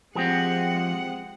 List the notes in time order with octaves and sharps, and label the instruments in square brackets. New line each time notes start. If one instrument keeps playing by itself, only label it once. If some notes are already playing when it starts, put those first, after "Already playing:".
[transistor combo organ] F3 [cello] G#3 F#5 [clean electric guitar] C4 G4 G#4